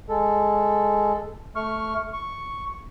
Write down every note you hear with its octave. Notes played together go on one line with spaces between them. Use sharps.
G#3 A4
A3 C#6 F6
C#6